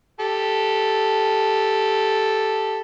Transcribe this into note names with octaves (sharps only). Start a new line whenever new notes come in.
G4 A4